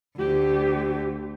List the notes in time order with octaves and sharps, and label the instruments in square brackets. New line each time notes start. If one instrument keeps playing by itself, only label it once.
[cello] D2 [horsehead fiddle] G4